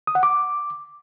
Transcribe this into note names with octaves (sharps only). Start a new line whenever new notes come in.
D#6
F#5
D6